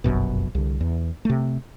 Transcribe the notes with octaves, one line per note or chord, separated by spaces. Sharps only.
F1 A#1 F#2 B2
C2 D3
E2
C3 A3